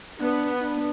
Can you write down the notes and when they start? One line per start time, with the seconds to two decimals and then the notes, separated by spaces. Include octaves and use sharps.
0.19 B3 D4
0.62 D4